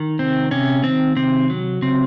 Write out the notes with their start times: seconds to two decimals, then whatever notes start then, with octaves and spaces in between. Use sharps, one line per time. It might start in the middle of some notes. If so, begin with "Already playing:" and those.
Already playing: D#3
0.19 C3 C4
0.51 C3 C#4
0.84 D#3 C4
1.16 C3 C4
1.50 F#3
1.82 C#3 C4